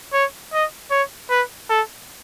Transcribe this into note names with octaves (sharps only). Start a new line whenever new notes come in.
C#5
D#5
C#5
B4
A4